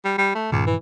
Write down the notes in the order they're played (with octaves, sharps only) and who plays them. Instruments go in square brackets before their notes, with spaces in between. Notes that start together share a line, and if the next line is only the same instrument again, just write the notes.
[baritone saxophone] G3
G3
A3
[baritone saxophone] C#2 [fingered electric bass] G2 A#2 D#3
[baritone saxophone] E3